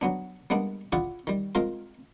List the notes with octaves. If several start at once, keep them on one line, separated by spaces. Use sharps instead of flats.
F#3 B3 D4
G3 G#3 A#3 B3 D4
E4 F4 G#4 D5 E5 F#5
D#3 G3
G#3 C4 F4 A#4 C6